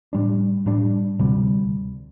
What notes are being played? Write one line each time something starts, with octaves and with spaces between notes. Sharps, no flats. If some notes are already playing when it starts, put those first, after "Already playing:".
A2 G3 D4
A2 G3 D4
D2 C3 G3